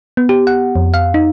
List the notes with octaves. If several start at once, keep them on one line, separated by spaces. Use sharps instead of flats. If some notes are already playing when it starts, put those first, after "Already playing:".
B3
G4
F#5
F2
F5
D#4